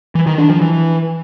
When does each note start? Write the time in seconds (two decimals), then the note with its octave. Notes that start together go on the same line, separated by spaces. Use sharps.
0.15 E3
0.27 D#3
0.38 D4
0.50 F3
0.61 E3